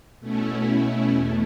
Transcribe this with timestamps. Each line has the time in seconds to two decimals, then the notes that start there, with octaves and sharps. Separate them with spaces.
0.19 B2 A3 C#4 E4
1.08 E2 B2 A3